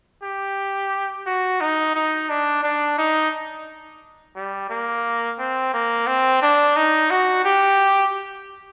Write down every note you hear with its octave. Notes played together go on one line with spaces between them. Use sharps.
G4
F#4
D#4
D#4
D4
D4
D#4
G3
A#3
C4
A#3
C4
D4
D#4
F#4
G4